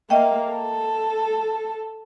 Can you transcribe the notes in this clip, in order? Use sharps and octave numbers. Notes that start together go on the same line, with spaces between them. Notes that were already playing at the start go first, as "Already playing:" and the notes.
A#3 D#5 E5 G5
A4